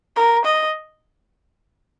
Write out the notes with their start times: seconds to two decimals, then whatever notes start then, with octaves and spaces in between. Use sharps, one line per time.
0.16 A#4
0.45 D#5